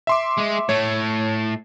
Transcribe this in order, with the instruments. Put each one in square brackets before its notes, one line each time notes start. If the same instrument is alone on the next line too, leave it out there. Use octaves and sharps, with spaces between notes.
[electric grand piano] E5 C6 D6
[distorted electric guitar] G#3 G#4
[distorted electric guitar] A2 A3 [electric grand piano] C#5